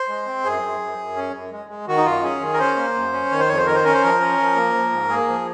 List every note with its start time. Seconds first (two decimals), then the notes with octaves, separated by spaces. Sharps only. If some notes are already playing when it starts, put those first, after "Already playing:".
Already playing: C5
0.08 G#3
0.26 C4
0.44 F#2 G#4
0.62 F#2
0.80 F#2
0.97 F#2
1.16 C#4
1.34 F#2
1.52 G#3
1.69 G#3
1.88 D#3 F#4
1.97 D#4
2.05 F#2 F4
2.23 C#4 G#4
2.41 D#3
2.54 A#4
2.59 C#4 C5
2.77 A#3
2.95 F#2
3.13 C#4
3.30 D#3 C#5
3.40 C5
3.48 F2 C#5
3.57 C5
3.66 D#3 A#4
3.75 C5
3.84 C#4 A#4
3.93 C5
4.02 F3 A#4
4.20 C#4
4.38 F3
4.56 A#3
4.74 F3
4.92 G#2
5.09 A#3 G#4
5.28 F3